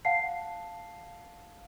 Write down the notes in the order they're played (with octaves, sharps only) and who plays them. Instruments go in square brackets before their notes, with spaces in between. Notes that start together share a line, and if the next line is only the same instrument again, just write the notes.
[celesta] F5 F#5 A5 C7